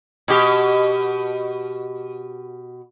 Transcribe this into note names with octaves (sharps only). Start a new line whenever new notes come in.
B2 G4